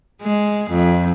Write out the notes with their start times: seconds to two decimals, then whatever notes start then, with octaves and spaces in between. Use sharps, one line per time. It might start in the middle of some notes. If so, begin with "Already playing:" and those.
0.22 G#3
0.70 F2